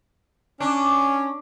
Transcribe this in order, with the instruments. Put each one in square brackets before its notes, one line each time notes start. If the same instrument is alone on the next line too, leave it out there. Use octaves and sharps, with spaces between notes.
[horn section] C#4 [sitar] D4